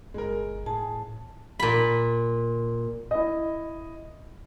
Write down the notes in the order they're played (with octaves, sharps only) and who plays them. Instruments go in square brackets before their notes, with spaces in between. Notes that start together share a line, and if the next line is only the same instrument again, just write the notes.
[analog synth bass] G1 [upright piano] G#3 A#4
[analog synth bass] A2 [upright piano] G#4 [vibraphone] A5
[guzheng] A#2 B5
[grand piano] E4 D#5